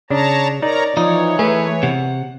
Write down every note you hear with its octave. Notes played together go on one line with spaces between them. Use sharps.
C#3 D4 C#5 A5 A#5
D#4 A#4 C#5 D5 A#5
E3 F3 D#4 C#5
A3 G#4 B4 A#5
C3 F#5